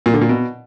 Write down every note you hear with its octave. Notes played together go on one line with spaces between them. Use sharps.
A#2
D3
A#2
B2